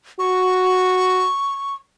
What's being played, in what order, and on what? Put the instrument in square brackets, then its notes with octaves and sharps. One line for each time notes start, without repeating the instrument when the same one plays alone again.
[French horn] F#4 [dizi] C#6